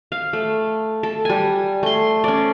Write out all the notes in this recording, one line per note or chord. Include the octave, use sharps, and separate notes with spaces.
F5
A3
A4
G3 G#5
A3 C6
C#4 D5